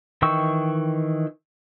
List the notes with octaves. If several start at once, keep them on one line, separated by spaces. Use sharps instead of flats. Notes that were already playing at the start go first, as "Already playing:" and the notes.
D#3 E3 G5 C#6 E6